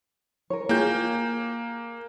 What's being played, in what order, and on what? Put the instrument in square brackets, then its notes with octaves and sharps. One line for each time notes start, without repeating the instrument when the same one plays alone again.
[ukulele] A#4 C#5
[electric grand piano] A#3 G6 [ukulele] F4 G4 G#4